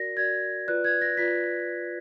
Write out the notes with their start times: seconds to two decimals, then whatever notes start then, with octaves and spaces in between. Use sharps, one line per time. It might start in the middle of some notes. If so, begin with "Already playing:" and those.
Already playing: F#4 A#4 D5 A#6
0.17 F#4 A#4 D5 G#6
0.68 F4 B4 D5 F#6
0.84 G#6
1.01 A#6
1.17 F4 B4 D5 B6